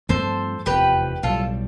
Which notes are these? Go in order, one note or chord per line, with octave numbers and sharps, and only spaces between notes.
G2 F3 A3 C4 A4 C5
F1 E2 C3 F3 G4 B4
B1 A2 G3 F4 A4